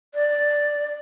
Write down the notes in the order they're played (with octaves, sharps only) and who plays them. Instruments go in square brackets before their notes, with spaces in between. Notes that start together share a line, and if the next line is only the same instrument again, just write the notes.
[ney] D5